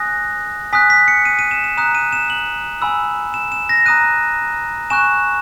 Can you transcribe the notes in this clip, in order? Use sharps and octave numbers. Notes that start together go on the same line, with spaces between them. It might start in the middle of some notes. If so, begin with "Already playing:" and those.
Already playing: G#5 D#6 F#6 A#6
G#5 D#6 F#6 B6
B6
C#7
D#7
D#7
E7
E7
A#5 D#6 F#6 E7
D#7
E7
F#7
G#5 B5 E6
E7
E7
A#6
A#5 D#6 F#6 D#7
G#5 C#6 F#6 E7